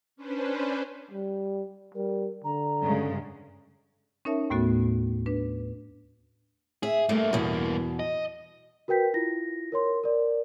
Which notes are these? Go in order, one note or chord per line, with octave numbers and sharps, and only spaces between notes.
C#4 D4 B4 C5
G3
G3 A#4
D3 A#5
G2 C#3 G#3
C#4 D#4 A#4 C#5 E5 A5
D#2 A2 A3 B3 F#4 A6
D4 B4
G#4 E5
G2 A3 A#3
E2 B2
D#5
F#4 A#4 B4 G5 G6 B6
E4 F4 A#6
A#4 C#5 C6
A#4 D5